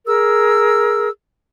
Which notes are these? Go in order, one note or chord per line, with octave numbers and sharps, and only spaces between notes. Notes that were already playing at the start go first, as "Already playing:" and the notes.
G#4 A#4 E6